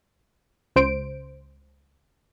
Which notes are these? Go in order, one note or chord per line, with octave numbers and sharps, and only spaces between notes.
C#2 C5 D7